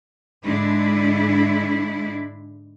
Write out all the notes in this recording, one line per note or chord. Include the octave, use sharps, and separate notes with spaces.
G#2 D3 G#3 D4 E4